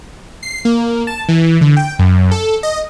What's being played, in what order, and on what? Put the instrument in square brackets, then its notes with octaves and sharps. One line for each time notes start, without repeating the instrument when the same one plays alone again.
[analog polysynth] C7
A#3
A5
E3
D3
G5
F#2
A4
D#5